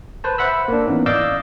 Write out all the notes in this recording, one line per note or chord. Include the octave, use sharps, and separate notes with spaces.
B4 C5 A5
C5 E5 F#5 B5 E6
A#3 D4
E3 B3 C#4 D#4
D5 D#5 F5 D6 E6 G6